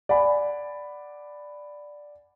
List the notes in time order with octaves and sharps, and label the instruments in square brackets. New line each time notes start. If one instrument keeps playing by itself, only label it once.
[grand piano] D5 F#5 G#5 B5